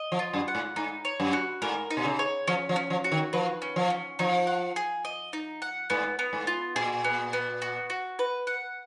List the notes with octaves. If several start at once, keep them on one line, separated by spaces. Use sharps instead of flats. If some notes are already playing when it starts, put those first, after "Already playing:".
Already playing: D#5
F3
F4
F#2
F#5
G#2
G#2 D#4
C#5
F#2
F#4
G#2 A#4
D#4
B2
C#3
C#5
F3 C#4
F3
C#4
F3
F#4
D#3
F3 B4
C#4
F3
C#4
F3 D#4
F#5
G#4
D#5
D#4
F#5
G#2 B3
B3
G#2
F4
A#2 G#4
B3
B3
F#4
F#4
B4
F#5